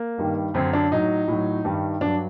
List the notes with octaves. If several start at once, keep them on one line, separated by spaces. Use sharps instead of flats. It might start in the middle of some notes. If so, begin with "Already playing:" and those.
Already playing: A#3
G2 D#3 G3
F#2 D3 F#3 C4
D4
A2 F#3 D#4
A2 F#3
G2 D#3 G3
G2 F#3 D4